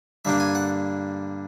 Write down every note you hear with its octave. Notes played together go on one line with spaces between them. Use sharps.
G2 D3 G3 A#3 D4 E5
G#5
F#5